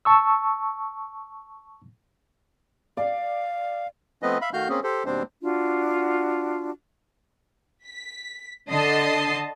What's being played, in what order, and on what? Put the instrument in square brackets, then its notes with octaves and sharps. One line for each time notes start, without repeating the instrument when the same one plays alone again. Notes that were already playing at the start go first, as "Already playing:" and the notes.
[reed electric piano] A5 C#6 E6
[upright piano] D5 [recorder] F5
[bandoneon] F3 A3 B3 C4 B4 D#5
E5 F5 B5
D#3 A3 F#4 F5 F6 G6
A#3 C4 C#4 G#4
G4 A4 C5
D#2 B2 G3 C4 D4 C5
[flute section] D4 F4 F#4
[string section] B6
D3 D#5 A5 C7